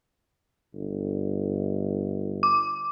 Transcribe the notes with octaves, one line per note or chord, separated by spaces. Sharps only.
G1
D6